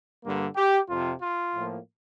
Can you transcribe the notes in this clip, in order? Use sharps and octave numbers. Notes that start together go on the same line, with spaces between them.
G2 D3 G3 A#3
G4
F2 C3 F3 F4
F4
A2 F3 A#3